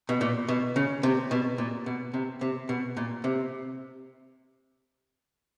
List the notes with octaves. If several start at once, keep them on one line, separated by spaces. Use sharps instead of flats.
B2
A#2
B2
C#3
C3
B2
A#2
B2
C3
C3
B2
A#2
C3